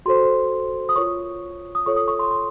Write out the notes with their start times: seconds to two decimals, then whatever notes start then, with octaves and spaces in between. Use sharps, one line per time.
0.06 F#4 A4 C5 C6
0.89 D#6
0.96 F4 A#4 C#5 C#6
1.75 D#6
1.86 F4 A4 C#5 C#6
1.96 D#6
2.08 C#6
2.19 C6
2.31 C6